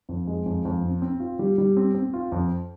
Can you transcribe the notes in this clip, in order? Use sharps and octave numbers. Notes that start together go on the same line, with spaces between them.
F2
G#3
F2
F2
C4
C4
F4
G3
G3
C4
C4
F4
F2